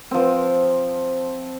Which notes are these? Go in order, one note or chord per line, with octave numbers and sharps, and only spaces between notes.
F3 C4